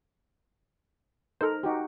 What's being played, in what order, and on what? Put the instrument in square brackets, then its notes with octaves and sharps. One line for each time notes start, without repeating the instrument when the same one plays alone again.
[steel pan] D#4 A#4 [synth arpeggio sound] A4 C5
[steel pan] D#4 F#4 G4